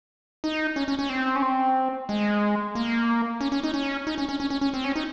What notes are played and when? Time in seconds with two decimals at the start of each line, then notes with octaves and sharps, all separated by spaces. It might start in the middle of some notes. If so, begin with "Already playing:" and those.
0.44 D#4
0.76 C#4
0.88 C#4
0.99 C#4
1.09 C4
1.35 C#4
1.42 C4
2.09 G#3
2.75 A#3
3.41 C#4
3.52 C#4
3.64 D#4
3.74 C#4
4.07 D#4
4.18 C#4
4.29 C#4
4.40 C#4
4.50 C#4
4.61 C#4
4.74 C4
4.84 C#4
4.96 D#4